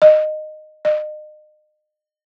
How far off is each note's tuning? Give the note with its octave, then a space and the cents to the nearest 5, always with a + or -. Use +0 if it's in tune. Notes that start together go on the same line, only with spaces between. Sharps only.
D#5 -15
D#5 -35